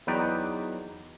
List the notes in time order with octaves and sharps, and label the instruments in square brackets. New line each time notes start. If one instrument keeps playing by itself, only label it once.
[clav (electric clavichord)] E2 F#3 D#4 B4 D5 G5